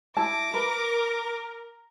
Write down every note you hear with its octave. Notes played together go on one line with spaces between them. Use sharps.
E4 A5 D6 A#6
A#4 B4